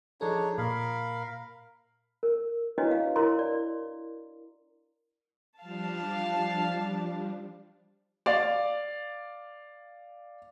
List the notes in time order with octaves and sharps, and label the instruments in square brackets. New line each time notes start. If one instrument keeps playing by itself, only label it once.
[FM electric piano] F3 G#4 A4 [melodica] D4 D#4 C#5
[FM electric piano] A#2 [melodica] A#4 F5 B5
[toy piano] A#4
D4 E4 F#4 B4 C#5 D#5
F5
E4 A#4 C#5 A#5 C6
D5
[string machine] F3 G3 D4 [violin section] F5 A5
[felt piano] D5 F5